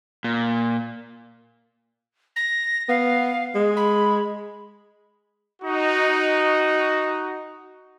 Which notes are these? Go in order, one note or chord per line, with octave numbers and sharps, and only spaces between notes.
A#2
A#6
B3 F5
G#3
B5
D#4 F#4